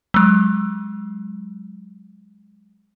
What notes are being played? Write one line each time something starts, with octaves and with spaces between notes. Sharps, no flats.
F#3 G#3